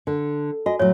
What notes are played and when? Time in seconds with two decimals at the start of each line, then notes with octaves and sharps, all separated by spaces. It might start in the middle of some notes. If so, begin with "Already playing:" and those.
0.07 D3
0.66 F#4 D#5 G#5
0.79 A2 F#3 C#5